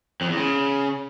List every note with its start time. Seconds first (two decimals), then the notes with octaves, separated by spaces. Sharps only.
0.21 F2
0.29 E2
0.37 C#3